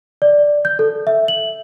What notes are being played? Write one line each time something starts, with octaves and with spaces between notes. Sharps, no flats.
D5
G6
A4
E5
F#7